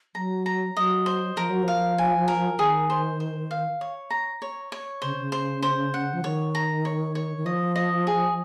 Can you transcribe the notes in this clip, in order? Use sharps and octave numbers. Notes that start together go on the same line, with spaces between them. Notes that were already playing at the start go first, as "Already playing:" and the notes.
F#3 A#5
A#5
F#3 D#5
C5
F3 A#4
F#3
F3 F5
G#5
A#4
D#3 G#4
C5
C5
F5
C#5
A#5
C#5
C#5
C#3 C5
C#3
C5
C5
F#5
F3
D#3 C#5
A#5
C#5
C#5
D#3
F3 D#5
D#5
G#4